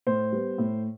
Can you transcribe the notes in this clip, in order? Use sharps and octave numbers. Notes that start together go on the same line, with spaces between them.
A2 C5
G3 B3
A2